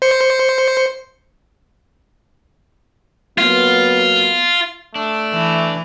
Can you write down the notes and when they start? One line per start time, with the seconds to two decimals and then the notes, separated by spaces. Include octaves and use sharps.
0.02 C5 C#7
3.38 F#3 A#3 B3 F4
4.95 A3 D4
5.33 E3